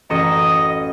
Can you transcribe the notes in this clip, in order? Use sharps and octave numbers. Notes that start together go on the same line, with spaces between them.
A1 F#2 C#4 D#5 A#5 D#6 C#7